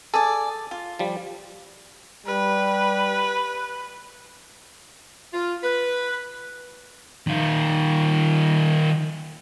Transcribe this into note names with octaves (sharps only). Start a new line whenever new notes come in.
G#4 A4 D5
F4
F3 G3
G3 B4
F4
B4
D#3 F4